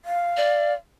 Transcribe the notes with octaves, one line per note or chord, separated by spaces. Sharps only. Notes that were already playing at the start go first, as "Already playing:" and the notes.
F5
D5